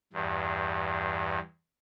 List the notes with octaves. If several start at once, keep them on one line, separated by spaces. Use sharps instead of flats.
E2 G2